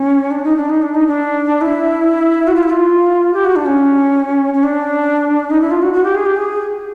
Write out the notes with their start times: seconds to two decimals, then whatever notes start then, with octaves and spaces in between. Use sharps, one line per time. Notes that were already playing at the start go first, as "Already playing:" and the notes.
Already playing: C#4
0.31 D4
0.44 D#4
0.56 D4
0.69 D#4
0.82 D4
0.95 D#4
1.07 D4
1.61 E4
2.47 F#4
2.55 F4
2.63 E4
2.70 F4
3.34 G4
3.45 F#4
3.56 D4
3.66 C#4
4.54 C#4
4.64 D4
5.50 D#4
5.61 E4
5.71 F4
5.82 F#4
5.93 F#4
6.04 G4
6.15 G#4
6.26 G4
6.36 G#4